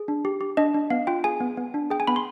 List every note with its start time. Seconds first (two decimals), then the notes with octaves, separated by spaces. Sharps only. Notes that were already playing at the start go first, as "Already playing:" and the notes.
Already playing: G#4
0.08 D4
0.25 G4
0.41 G4
0.57 D4 D#5
0.74 D4
0.90 B3 F5
1.07 F4 G5
1.24 G#4 G#5
1.40 B3
1.57 B3
1.74 D4
1.90 G#4 G5
2.00 G#5
2.07 B3 B5
2.16 C6